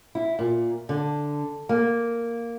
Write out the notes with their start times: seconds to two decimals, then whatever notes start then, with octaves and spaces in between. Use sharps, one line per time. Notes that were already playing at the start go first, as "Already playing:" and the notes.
0.15 E4
0.39 A#2
0.89 D3
1.69 A#3